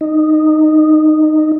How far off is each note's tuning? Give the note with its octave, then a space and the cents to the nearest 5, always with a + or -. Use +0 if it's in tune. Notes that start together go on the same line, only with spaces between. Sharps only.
D#4 -10